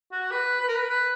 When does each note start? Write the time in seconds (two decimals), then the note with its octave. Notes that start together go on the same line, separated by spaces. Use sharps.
0.12 F#4
0.31 B4
0.61 B4
0.68 A#4
0.76 B4
0.89 B4